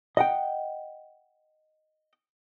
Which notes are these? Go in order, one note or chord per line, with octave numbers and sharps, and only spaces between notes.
D#5 F#5 G5